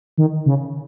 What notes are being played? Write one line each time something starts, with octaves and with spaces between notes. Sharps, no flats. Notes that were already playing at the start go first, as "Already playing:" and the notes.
D#3
C#3